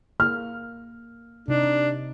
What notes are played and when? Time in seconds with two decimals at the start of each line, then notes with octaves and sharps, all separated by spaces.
0.20 A#3 F6
1.48 C3 D4 D#4